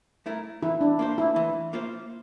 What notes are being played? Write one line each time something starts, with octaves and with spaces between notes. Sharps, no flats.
A3 E4 A#4
E3 E4
D4
A#3 F4 C5
E4
E3
A#3 F4 C5